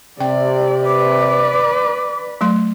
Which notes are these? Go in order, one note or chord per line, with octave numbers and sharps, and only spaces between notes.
C3 D5 G5
B4 D5 D6
F#3 A3 C6